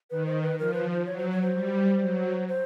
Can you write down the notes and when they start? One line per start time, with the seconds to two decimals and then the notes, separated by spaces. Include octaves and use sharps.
0.11 D#3 B4
0.26 C5
0.42 B4
0.59 F3 A#4
0.74 B4
0.90 C5
1.05 F#3 C#5
1.18 C5
1.30 C#5
1.42 C5
1.54 G3
2.01 F#3
2.48 C5